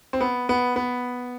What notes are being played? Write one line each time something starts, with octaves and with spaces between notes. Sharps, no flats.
C4
B3
B3
B3